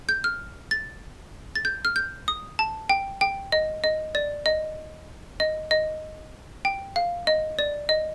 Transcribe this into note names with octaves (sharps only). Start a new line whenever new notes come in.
G6
F6
A6
A6
G6
F6
G6
D#6
A5
G5
G5
D#5
D#5
D5
D#5
D#5
D#5
G5
F5
D#5
D5
D#5